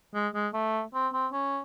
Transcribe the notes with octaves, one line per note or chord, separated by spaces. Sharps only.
G#3
G#3
A3
C4
C4
C#4